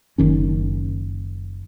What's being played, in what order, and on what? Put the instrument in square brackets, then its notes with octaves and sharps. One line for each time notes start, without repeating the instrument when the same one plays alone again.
[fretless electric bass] F#1 D#3 C#4